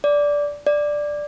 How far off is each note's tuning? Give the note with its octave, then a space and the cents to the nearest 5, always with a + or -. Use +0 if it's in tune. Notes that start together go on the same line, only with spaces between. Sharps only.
D5 -10
D5 +5